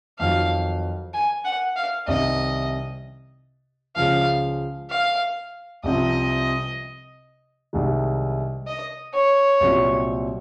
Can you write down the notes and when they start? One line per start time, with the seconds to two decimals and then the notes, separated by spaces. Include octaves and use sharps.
0.19 F2 D#3 F#3 F5
1.14 G#5
1.45 F#5
1.76 F5
2.08 C2 C3 D#3 D#5
3.96 C#2 C#3 F3 F5
4.90 F5
5.84 C2 C3 F3 C4 D#5
7.73 C2 C3 D#3 G#3
8.67 D#5
9.14 C#5
9.60 C2 A#2 F#3 C4